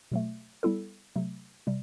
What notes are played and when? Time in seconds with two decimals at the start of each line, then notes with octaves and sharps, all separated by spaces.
0.11 B2 F#3 A3
0.63 G3 B3 E4 A4
1.16 C3 F#3 A3
1.67 C3 G3